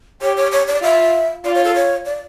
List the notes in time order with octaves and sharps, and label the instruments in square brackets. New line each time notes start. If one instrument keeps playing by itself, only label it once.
[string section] G4 [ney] C#5
[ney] C#5
C#5
D5
[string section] F4 [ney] E5
[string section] F4 [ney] D5
[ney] C#5
A4
C#5
D5